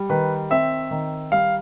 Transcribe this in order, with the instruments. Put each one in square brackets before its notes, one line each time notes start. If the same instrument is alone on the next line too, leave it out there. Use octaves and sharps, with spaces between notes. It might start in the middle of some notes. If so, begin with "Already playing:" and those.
Already playing: [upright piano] G3
[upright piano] D#3 [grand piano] B4
[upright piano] C4 [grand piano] E5
[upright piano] D#3
[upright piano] G3 [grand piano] F5